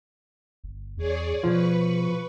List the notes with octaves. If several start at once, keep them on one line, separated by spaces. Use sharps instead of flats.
G1
E2 G#4 C#5 D5
B2 F3 B4 C#6